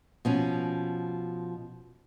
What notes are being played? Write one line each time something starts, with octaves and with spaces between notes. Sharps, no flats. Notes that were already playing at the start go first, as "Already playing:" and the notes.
B2 F3 C#4